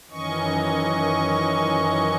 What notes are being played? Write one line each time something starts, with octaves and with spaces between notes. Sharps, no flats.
F#2 D#3 E3 C#4 D#5 C#6